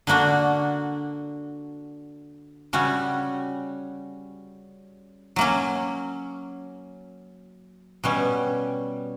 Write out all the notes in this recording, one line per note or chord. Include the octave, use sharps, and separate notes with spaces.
D3 A#3 D4 F#4
C#3 G3 C#4 F#4
F#3 A#3 C#4
B2 G3 C#4